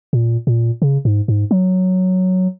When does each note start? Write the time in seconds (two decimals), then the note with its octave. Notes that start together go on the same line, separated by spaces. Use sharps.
0.13 A#2
0.47 A#2
0.82 C#3
1.05 G#2
1.28 G#2
1.51 F#3